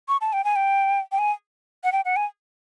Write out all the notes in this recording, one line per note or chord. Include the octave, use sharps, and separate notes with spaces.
C#6
A5
G5
G#5
G5
G5
G#5
F#5
G5
F#5
G#5